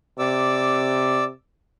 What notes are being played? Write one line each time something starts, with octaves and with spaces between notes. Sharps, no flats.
C3 D5 D6 E6